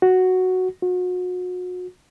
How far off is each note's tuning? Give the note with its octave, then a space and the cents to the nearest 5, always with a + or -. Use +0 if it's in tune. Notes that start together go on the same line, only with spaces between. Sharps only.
F#4 +0
F#4 -35